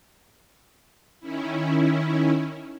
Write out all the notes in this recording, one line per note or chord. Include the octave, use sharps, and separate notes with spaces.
D#3 C#4 E4